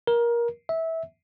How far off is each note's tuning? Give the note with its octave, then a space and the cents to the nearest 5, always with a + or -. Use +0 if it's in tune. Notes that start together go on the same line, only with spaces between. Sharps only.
A#4 +20
E5 -20